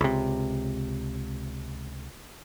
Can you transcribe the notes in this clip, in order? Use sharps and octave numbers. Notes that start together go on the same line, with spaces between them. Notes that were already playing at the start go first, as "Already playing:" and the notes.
C#2 C3